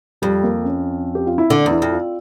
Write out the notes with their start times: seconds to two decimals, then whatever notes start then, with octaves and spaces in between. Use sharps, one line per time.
0.22 F2 G3
0.43 A#3
0.64 C#4
1.15 G4
1.27 F4
1.38 E4
1.50 D3 D4
1.66 E2
1.71 E4
1.82 F2
1.92 F4